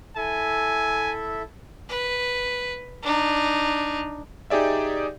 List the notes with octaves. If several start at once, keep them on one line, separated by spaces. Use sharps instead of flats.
E4 A4 E5 G#5
B4
D4 D#4
D#4 G4 G#4 D5 E5